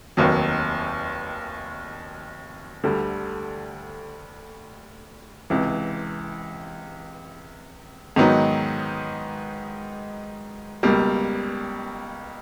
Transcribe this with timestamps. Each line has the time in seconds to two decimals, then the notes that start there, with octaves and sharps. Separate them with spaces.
0.17 F1 D#2 D#3 F#3
2.84 D2 D3 G3
5.50 C#2 C3 E3
8.16 G#2 D#3 F#3 B3 D#4
10.83 C#2 B2 G3 A#3